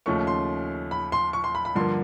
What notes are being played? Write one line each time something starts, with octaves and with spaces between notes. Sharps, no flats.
D#2 C#3 F3 A3 C#4 C#6
C6
B5
C6
C#6
C6
B5
B5
G2 D3 F3 A#3 C6